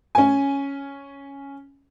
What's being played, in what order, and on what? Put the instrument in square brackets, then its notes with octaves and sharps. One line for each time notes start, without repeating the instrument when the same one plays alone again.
[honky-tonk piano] C#4 G#5